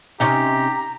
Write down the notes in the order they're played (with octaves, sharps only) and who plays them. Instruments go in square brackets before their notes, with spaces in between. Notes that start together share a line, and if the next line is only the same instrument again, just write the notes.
[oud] C3 C#4 D#4 [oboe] G4 [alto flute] A#5